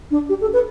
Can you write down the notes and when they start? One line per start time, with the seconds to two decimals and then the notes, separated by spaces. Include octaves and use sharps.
0.11 D4
0.29 G4
0.41 A4
0.53 B4